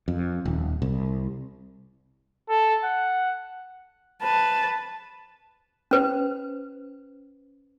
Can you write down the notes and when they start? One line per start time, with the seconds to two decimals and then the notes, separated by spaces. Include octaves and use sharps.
0.08 F2
0.45 D#1
0.82 C2
2.49 A4
2.83 F#5
4.22 B4 A5
5.91 C#4 B4 C5